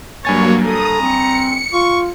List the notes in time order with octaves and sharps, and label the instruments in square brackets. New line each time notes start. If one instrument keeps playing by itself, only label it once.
[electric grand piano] G2 G#5 A6 [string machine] F#3 A#3 [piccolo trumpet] C#5
[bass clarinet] A4 [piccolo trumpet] A#5 [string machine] D#6
[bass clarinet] C4 [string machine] C#7
[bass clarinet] F4 [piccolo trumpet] C#6